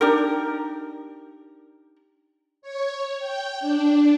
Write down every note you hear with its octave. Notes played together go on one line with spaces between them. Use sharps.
D4 D#4 G4 A#4
C#5
G5
D4